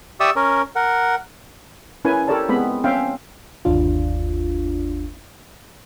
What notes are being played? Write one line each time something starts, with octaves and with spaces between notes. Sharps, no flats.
G4 D5 E5 C#6 D#6 E6
C#4 A#4
A#4 F#5
C#4 E4 A#4 B4 G#5
G4 A4 A#4 C#5 D5 A5
G#3 B3 C4 B5
C4 C#4 E5 F5 G5
G1 D#2 D4 F4